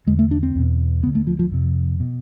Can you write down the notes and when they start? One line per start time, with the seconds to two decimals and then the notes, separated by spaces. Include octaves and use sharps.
0.07 E2 D3 G#3
0.19 A3
0.31 D4
0.43 C4
0.55 E2 B2
1.03 D2 D3 B3
1.15 A3
1.27 F3
1.39 F3
1.51 F2 C3
2.00 B2